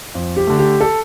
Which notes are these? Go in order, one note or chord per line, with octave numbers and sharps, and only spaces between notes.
F2
G4
D3 A3
G4
A4